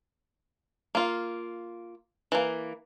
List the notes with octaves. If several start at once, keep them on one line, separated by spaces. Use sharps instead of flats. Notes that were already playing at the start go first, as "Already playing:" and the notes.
A#3 F4
E3 A#3